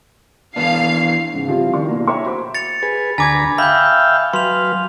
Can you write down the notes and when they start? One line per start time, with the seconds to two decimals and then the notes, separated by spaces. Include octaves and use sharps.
0.56 E3 B3 D4 F5 C7
1.33 G#2 C#3
1.48 F3 G3 C4 E4 F4 G4
1.74 D#3 D4 C#6
1.88 B2 F#3 A#3 D4 E4
2.07 C#5 E5 G5 A#5 C#6
2.26 F#4 C5 B5 D6
2.55 A6 C#7 F7
2.83 G#4 B4
3.18 D2 G#5 A#5 B5 D6 G#6
3.58 E5 F5 G5 B5 G6
4.33 F#3 B4 F5 C6 F7